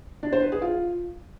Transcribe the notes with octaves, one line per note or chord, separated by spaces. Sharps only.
D4
C5
B4
G#4
F4